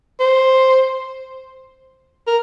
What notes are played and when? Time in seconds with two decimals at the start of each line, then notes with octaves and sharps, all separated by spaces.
0.20 C5
2.27 A#4